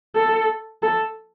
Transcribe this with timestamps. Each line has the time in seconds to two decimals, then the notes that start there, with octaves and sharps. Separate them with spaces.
0.15 A4
0.82 A4